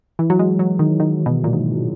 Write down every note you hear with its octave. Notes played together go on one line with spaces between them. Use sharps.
E3
F#3
G#3
F#3
D#3
D#3
B2
A#2
G#2